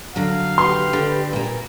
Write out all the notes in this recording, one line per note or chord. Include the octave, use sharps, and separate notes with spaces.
D3 F#3 F5
G4 B4 C6
D3
A#2 A#3